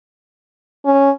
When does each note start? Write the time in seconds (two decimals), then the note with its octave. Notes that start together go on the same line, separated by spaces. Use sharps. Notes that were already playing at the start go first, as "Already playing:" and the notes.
0.85 C#4